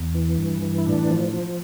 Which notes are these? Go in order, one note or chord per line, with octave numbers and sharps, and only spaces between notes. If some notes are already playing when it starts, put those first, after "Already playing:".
Already playing: E2
E3
G2
E3
E4
A2 D4
F3
F3